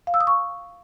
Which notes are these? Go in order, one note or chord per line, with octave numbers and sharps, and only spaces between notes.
F5
E6
D#6
C#6